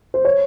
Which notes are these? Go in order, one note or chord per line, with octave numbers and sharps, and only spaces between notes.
C5
C#5